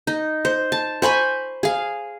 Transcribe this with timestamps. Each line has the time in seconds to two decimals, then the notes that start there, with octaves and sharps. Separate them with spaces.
0.07 D#4
0.45 C5
0.72 A5
1.02 C5 G#5 B5 C#6
1.63 G#4 F5